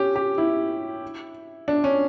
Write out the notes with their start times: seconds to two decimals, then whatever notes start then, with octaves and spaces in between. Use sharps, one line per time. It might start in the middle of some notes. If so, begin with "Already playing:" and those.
Already playing: C#4 G4
0.16 G4
0.38 E4
1.68 D4
1.84 C#4